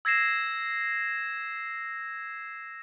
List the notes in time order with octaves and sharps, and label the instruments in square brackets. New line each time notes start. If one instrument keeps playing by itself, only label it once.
[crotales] E6 G#6 A#6 C7 E7